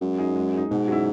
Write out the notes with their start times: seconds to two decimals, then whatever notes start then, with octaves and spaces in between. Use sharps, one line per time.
0.01 F#2 G#3
0.18 D#4 G#4
0.36 G#3
0.53 D#4 G#4
0.71 G#2 B2
0.88 F#3 C#4 E4